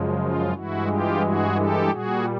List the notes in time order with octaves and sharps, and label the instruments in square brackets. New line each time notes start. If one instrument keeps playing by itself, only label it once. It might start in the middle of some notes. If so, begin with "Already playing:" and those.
Already playing: [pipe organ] F#2 C#3 F3 G#3
F4
G2 E3 G#3 E4 F#4
F4 G4
F#4 G#4
G4 A4
A#2 G3 F#4 G#4